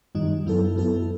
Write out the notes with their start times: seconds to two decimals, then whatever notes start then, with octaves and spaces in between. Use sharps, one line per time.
0.15 G2 D#3 G3 D#4
0.46 F#2 F#3 B3 E4 A4
0.76 F#2 F#3 B3 E4 A4